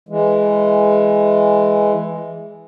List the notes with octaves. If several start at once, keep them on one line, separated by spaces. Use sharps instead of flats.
E3 G#3